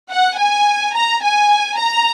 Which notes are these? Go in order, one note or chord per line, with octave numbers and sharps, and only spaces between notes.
F#5
G#5
A#5
G#5
A#5